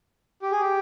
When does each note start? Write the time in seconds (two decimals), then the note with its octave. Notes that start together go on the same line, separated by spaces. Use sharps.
0.42 G4
0.52 G#4
0.61 G4